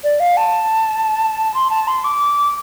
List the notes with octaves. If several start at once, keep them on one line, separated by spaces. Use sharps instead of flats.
D5
F5
A5
C6
A5
C6
D6